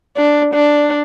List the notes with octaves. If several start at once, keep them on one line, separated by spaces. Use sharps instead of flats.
D4
D4